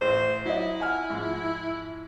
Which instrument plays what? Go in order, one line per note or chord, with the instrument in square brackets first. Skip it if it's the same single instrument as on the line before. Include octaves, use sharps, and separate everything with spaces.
[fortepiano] A1 [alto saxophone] C5
[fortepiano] F#3 D5 D#5 [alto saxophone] E4
[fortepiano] F#5 G#5 F6
G#2 F3 G#3